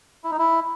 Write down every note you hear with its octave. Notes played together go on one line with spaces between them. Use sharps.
E4
D#4
E4